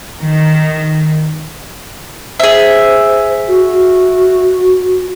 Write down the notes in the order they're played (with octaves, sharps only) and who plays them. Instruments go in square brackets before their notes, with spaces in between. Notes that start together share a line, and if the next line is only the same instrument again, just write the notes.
[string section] D#3
[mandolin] G#4 E5 [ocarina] C5
[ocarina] F#4